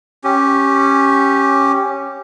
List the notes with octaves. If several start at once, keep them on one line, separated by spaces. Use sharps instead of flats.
C#4 G4